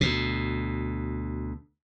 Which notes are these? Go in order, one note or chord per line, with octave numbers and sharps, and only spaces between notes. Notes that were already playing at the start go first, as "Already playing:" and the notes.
D2 B2